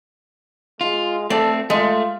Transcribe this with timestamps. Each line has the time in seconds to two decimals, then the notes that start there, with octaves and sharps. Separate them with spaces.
0.81 G#3 F4
1.30 A3 C4 A4 D5
1.70 G#3 A3 F4